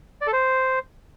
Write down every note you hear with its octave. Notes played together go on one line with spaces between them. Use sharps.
D5
A4
C5